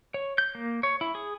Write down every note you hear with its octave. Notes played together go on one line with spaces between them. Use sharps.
C#5
G6
A#3
C#5
E4
G#4